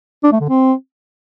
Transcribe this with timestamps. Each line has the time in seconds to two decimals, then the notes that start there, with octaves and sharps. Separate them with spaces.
0.24 D4
0.32 A3
0.40 D3
0.49 C4